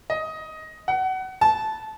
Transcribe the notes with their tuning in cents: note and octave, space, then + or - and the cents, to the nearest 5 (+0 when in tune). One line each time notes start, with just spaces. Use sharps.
D#5 +10
F#5 +25
A5 -15